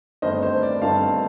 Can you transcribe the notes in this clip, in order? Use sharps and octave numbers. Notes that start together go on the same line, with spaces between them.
G1 G2 D#3 A3 C4 C5 D#5
C5
D5
G1 G2 D#3 A3 C4 F5 A5